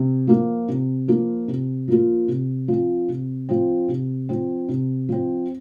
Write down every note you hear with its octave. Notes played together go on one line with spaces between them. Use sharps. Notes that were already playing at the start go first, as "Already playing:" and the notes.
Already playing: C3
F3 A#3 F4
C3
F3 A#3 F4
C3
F3 A#3 F4
C3
F3 C4
C3
F3 C4
C3
F3 C4
C3
F3 C4